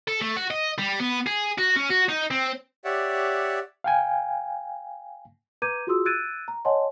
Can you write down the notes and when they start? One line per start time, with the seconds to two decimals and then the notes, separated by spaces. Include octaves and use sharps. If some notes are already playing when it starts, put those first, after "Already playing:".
0.08 A4
0.21 A3
0.37 F#4
0.51 D#5
0.78 G3
1.00 B3
1.27 G#4
1.58 F#4
1.76 C#4
1.90 F#4
2.09 D#4
2.31 C4
2.85 G4 C#5 D5 E5 F#5
3.84 F5 G5 G#5
5.62 B4 A#5 D6 G6 G#6 D#7
5.87 F4 F#4 G#4 C6 D#6 E6
6.06 E6 F#6 G#6 A6 D7 D#7
6.48 A#5
6.65 C#5 D#5 F#5 G#5 A5 C6